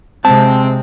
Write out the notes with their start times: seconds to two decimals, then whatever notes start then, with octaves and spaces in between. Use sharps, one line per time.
0.25 C3 G#3 C4 A5